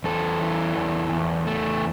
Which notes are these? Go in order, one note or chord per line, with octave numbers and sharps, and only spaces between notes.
E2 A4
E3
E2
E2
A3